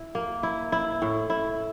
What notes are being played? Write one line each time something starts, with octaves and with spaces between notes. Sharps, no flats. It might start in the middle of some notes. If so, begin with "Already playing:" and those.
Already playing: E4
A#3
E4
E4
A2
E4